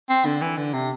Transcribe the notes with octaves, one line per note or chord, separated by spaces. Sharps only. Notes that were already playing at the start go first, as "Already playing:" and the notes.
C4
D3
E3
D3
C3